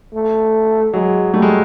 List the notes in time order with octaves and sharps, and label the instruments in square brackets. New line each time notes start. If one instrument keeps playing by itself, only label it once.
[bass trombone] A3
[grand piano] F#3 [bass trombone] G#3
[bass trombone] G3 [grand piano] A3
[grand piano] G#3